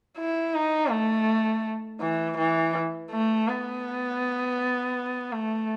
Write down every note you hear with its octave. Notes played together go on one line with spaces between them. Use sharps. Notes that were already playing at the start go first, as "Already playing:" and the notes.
E4
D#4
A3
E3
E3
A3
B3
A3